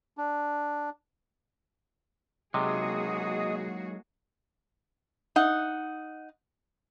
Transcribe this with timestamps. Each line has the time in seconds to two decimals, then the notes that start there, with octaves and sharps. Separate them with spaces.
0.17 D4
2.54 C3 F#3 G#3 A#3 D#4 F#4 G#4 D#5
5.36 D#4 F#5